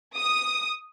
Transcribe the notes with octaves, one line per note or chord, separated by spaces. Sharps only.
D#6